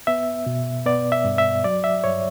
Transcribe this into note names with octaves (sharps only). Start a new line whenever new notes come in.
B3 E5
B2
B3 D5
E5
G2
E5
F#3 D5
E5
G2 C#5